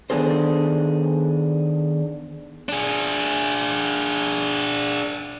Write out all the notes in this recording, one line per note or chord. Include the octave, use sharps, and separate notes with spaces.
D#3 B3 D4 G#4 A4 C5
D4 G#4